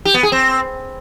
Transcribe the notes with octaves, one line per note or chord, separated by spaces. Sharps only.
G4
B3
G#4
C4